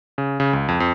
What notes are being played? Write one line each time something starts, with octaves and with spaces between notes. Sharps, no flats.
C#3
C#3
C#2
F2
F2